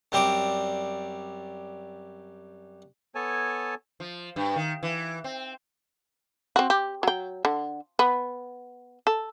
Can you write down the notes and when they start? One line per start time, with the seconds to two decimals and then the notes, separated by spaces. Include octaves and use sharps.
0.12 F#2 G3 C4 D5 D6
3.15 B3 A4 C#5 G#5 A5
4.00 F3
4.36 G2
4.56 D#3
4.83 E3
5.24 C4
6.56 C4 F#4
6.70 G4
7.03 F#3 G5
7.45 D3
7.99 B3
9.07 A4